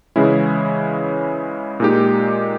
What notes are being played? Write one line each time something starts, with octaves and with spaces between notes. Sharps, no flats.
C#3 E3 G#3 C#4 E4
A#2 G#3 D#4 G4